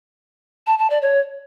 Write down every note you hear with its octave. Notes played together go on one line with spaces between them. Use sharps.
A5
A5
D5
C#5